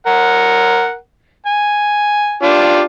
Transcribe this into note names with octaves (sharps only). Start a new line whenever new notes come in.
A#4 F#5
G#5
D4 F4 G4